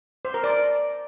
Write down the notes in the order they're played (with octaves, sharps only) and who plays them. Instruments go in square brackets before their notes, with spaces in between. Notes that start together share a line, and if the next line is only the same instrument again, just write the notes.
[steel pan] C5
A#4
D5